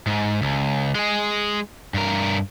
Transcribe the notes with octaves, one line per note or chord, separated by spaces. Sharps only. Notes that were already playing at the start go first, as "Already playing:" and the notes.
G#2
C#2
G#3 G#4
G2 A#4